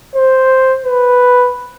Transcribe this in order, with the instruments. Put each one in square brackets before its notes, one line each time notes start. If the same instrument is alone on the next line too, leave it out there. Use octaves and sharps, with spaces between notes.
[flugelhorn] C5
B4